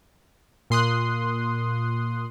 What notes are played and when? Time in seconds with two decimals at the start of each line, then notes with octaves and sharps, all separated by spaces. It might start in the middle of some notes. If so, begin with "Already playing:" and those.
0.70 A#2 C6 D#6 F#6